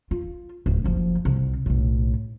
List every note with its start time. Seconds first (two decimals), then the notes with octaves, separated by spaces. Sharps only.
0.11 F4
0.66 D1
0.84 F#1 F3
1.25 C2
1.66 B1 A2